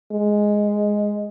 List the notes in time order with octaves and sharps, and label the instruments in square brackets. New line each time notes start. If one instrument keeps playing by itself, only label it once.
[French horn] G#3